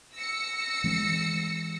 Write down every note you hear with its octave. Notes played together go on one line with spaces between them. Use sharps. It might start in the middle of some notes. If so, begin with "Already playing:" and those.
E6 A#6 C#7
E3 G#3 C4